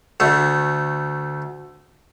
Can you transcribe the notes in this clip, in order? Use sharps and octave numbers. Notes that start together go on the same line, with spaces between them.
D2 A3